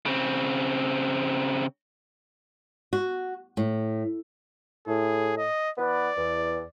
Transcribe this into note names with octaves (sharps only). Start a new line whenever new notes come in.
C#3 C4
F#4
A2
A2 G#4
D#5
E3 B3 B4 D5
E2